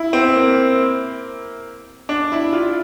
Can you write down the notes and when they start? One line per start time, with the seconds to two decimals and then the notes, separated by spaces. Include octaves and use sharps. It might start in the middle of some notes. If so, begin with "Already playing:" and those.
Already playing: E4
0.13 C4
0.35 A#3
2.09 D4
2.32 E4
2.53 F4